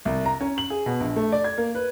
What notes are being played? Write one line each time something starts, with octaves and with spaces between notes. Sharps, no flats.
C2
A#5
C#4
F#7
G#4
B2
A#1
A3
D5
G#6
A#3
B4